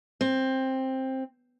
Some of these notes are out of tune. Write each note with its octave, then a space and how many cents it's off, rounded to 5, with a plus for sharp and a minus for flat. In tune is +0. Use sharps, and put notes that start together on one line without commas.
C4 +10